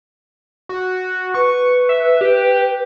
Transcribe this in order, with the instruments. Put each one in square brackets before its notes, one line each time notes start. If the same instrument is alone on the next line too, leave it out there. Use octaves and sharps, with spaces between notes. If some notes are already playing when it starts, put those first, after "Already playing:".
[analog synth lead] F#4
[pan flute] B4 [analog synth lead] C#6
[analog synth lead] E5
G4